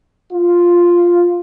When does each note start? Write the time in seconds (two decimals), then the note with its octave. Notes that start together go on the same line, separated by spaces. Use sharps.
0.33 F4